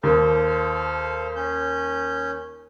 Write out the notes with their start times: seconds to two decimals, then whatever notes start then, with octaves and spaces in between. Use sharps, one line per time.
0.03 D#2 A4 C5 F5
1.36 C#4 G6